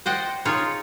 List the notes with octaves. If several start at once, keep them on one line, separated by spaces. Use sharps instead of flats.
C5 D5 D#5 F#5 G5
D#4 F4 G#4 C#5